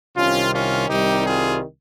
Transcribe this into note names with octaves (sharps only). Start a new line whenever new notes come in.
C2 C3 D#3 C#4 F4
C#4 F4
C2 C3 D#3 G3 D#4 G4
F4 G#4